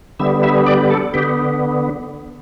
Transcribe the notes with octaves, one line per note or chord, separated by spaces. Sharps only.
D3 G3 B3 E5
E5
D5
A4
D3 B3 G4